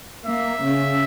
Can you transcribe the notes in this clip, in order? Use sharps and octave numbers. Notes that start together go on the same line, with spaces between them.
A#3 E5
C#3